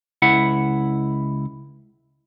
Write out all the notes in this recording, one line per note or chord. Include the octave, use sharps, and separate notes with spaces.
C#2 E4 F#5